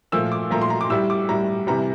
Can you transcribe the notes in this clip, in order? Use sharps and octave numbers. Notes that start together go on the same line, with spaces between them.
A#2 F3 A3 E6
D6
A#2 F3 A3 A#5
C6
A#5
D6
A2 G3 E6
D6
A2 G3 A#5
C3 E3 G3 A#5